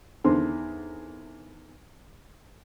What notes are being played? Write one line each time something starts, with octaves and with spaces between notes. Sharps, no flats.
E2 D3 D#3 C4 D4 C6